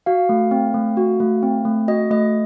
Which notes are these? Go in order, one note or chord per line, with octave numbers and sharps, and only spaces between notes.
F#4 F5
A3
C4
A3
F#4
A3
C4
A3
F#4 D#5
A3 D#5